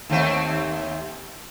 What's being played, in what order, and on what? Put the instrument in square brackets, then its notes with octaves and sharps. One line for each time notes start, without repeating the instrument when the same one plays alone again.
[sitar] D#2 A3 C4